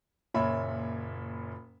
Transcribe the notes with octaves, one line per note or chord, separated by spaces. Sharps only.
F#1 A#2 C#5 E5 B5